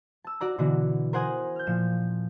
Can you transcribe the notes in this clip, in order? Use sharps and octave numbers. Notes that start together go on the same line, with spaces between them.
A5 E6
F#4 D5 A#5
B2 D3 E3 F#4
A#4 C5 F#5 G#5 D#6
F6 G6
A#2 F3 E7